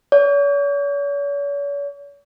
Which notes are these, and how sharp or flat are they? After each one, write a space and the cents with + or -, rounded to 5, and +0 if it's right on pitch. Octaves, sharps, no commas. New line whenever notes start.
C#5 +45